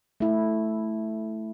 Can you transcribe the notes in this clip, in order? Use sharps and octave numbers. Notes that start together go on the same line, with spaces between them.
A3 E4